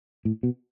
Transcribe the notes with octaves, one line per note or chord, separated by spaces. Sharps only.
A2
B2